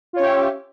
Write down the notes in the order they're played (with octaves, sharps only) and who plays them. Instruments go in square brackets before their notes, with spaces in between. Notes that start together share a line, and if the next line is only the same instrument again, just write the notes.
[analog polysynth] F4
C#5
C#4
G4
E5